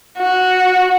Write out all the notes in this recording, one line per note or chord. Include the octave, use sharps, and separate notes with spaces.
F#4